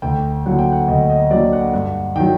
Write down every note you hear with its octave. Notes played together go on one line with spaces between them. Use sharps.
D2 G5
D3 F#3 A#3 F#5
G5
F#5
D2 D#5
D#5
D3 F#3 A#3 D5
F#5
G2 F#5
D#3 F#3 G5